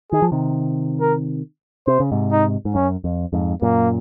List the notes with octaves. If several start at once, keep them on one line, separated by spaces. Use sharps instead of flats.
D#3 G#4
F3
C3 D#3
A#4
C3 C5
C#3
G#2 C3
D#4
G#2
F#2 C#4
F2
F2 G#2
F#2 A#2 A#3